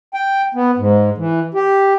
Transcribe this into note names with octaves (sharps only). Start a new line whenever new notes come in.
G5
B3
G#2
E3
G4